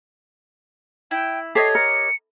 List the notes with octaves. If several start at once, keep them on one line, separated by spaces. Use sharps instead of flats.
E4 G5
G4 A4 C#5 D#5 C7
A#4 C#7